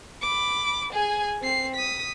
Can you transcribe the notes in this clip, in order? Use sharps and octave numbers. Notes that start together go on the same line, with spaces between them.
B5 D6
G#4 G#5
C4 C7
D#6 B6